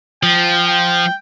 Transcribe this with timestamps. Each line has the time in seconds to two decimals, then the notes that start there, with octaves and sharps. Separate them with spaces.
0.23 F3 G5
0.68 G5